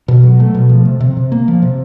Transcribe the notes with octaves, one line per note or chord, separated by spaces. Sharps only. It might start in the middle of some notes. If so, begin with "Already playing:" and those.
B2
F#3
A3
B2
F3
C3
C3
C3
A#3
F3
C3